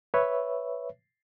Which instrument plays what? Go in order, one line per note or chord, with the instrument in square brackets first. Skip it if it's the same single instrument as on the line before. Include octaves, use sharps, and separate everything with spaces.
[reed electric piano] B4 C#5 E5